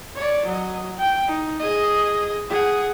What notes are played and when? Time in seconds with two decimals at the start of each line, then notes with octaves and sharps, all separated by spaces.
0.16 C#5 D5
0.45 F#3 D#5
0.97 G5
1.27 D#4
1.60 G#4 D#5
2.49 G#4 F#5